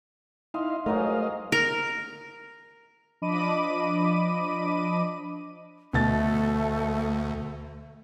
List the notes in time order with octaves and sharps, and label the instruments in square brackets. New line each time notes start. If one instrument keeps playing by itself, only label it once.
[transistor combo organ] D#4 E4 F5 [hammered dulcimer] D#5 C6
[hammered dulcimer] G#2 F#3 G#3 [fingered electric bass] A3 [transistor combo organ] A#4 D#5 F5
[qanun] A#4
[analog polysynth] F3 D4 D#5 B5 D6 D#7
[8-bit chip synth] D2 [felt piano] B2 A6 [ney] A3